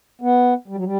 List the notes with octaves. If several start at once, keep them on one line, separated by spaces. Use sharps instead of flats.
B3
G3
F#3
G3